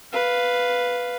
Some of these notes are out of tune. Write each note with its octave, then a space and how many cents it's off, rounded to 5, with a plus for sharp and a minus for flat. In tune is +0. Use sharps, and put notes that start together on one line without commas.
B4 +0 F5 +0